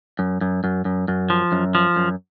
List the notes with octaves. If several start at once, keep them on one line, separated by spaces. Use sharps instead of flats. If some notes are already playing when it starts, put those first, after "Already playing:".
F#2
F#2
F#2
F#2
F#2
F3
F#2
F3
F#2